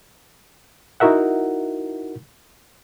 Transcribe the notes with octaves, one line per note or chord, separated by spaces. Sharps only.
D#4 E4 F#4 A#4 E5 F#5